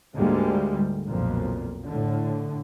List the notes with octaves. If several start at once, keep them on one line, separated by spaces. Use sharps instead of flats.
D2 G#2 D3 G3 G#3 A#3
B1 F2 A#2
A2 D3